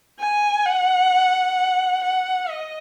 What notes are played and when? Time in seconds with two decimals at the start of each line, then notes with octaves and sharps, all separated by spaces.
0.19 G#5
0.65 F#5
2.03 F#5
2.50 D#5